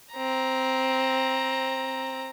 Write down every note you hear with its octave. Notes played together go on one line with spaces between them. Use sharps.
C4 A#5